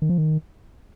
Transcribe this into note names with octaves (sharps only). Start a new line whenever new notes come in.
D#3
F3
D#3